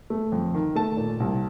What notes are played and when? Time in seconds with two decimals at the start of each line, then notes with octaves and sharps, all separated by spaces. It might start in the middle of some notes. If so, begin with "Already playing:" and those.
0.10 A3
0.32 F2
0.54 D#3
0.75 A3 A5
0.97 A#2
1.20 C2